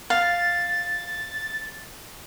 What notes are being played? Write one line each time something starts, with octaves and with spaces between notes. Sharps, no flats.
F5 A6